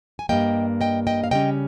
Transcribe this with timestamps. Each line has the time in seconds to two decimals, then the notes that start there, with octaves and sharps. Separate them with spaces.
0.19 G#5
0.29 G2 G3 A#3 D#5 G5
0.81 D#5 G5
1.07 D#5 G5
1.24 F5
1.31 C#3 G3 C#4 D#5 G5